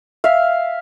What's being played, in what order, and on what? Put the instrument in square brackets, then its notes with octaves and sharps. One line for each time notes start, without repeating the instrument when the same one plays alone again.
[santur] E5 F5